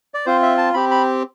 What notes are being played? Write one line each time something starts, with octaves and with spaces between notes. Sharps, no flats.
D5
C4 F4 C5
E5
A5
C4 G4 B5
B5